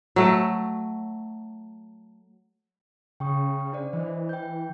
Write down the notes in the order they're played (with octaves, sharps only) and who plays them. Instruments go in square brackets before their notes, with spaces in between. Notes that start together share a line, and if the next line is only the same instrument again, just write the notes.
[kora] F#3 A3
[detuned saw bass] C#3 [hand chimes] G5 C#6 D#6
[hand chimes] D4 C5 D5
[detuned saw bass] E3 [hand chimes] C5 D#5
[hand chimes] G5 G6